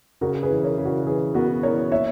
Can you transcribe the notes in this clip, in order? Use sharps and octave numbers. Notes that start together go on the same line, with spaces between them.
C#3 F#4 A#4
G#4 B4
E3
A#4 C#5
C#3
F#4 A#4
E3 G#4 B4
B3 F#4 A#4
E3 A#4 C#5
A#3 C#5 E5